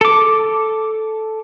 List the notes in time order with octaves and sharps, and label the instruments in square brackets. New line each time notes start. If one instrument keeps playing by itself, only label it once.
[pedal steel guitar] A4 D6